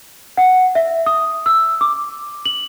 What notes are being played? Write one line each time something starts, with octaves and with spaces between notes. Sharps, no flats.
F#5
E5
D#6
E6
D6
F#7